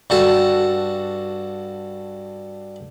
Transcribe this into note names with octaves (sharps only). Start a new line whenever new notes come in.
G2 F#4 A4